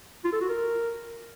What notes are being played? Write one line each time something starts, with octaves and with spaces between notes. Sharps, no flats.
F4
A4
F#4
A#4